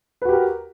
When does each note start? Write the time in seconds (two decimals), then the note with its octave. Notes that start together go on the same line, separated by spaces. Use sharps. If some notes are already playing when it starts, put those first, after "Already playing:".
0.22 B4
0.25 F#4
0.29 G4
0.32 A#4